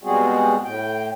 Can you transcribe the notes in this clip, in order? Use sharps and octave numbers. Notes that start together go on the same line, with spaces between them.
B2 G3 G#3 C4 F#4 G#4
A2 G5